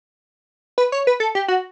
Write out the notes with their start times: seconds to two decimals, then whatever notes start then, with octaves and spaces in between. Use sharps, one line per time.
0.78 B4
0.92 C#5
1.07 B4
1.20 A4
1.35 G4
1.48 F#4